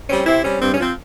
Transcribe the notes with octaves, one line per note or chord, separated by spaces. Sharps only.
G3 C4 C#4
C3 C4 E4
G3 C4 C#4
G2 C4
C#4
F3 C4